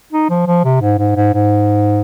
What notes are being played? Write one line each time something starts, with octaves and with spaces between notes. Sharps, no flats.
D#4
F3
F3
C3
G#2
G#2
G#2
G#2